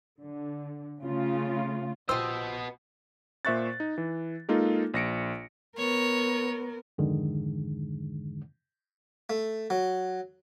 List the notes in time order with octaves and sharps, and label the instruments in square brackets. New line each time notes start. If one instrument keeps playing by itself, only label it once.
[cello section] D3
C#3 A3 F4
[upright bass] A#1 [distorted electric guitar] B3 D#5 [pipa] F4 G4 C5 [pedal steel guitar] E6
[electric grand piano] A#2 C5 E5 C#6 F#6 A6
D#4
E3
G#3 A#3 D#4 F4 A4
A#1 A#6 C#7 D7
[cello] B3 A#4 [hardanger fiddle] C#5
[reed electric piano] F2 G#2 D3 D#3 G#3
[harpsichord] A3
F#3